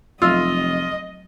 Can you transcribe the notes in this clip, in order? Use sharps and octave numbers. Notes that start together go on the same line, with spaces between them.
F1 F#3 F4 D#5 E6